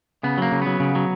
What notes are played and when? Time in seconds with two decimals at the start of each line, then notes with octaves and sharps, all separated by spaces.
0.23 C#3 B3
0.38 F#3 A#3
0.52 C#3
0.62 F#3 B3
0.80 C#3
0.95 F#3